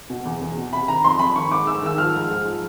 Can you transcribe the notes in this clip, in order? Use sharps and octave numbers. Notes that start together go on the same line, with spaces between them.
B2
E2
E2
B2
C3 B5
D#3 A#5
F2 C6
F2 B5
D#3 C#6
G#2 D6
G#2 E6
D#3 E6
F3 F6
G#2
G#2
F3